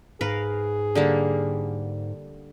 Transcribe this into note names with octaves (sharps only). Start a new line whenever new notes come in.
G#2 G#4 A#4 B4 F5
D3 G3 A#3